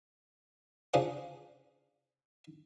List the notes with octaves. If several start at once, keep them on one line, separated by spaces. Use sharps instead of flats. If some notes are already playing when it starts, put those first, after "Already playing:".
C#3 C#4 D4 F4 G#4 C5